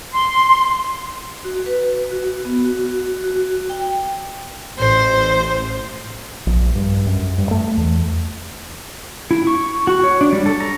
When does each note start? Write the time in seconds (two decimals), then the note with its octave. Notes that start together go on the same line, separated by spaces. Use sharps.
0.13 C6
1.45 F#4
1.66 B4
2.11 F#4
2.45 B3
2.64 F#4
3.24 F#4
3.69 G5
4.79 A1 C5
6.47 A#1
6.75 G2
7.06 F#2
7.38 G2
7.51 A3
7.77 E2
9.31 E4
9.47 C#6
9.87 F#4
10.04 C#5
10.21 D4
10.32 G3
10.46 A4
10.60 A#5